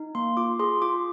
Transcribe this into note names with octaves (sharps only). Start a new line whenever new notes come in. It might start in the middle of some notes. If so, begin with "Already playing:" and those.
Already playing: D#4
A#3 C6
F4 D6
G#4 C6
F4 D6